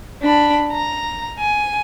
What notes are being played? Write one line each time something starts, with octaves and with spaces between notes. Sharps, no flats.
D4 B5
A#5
G#5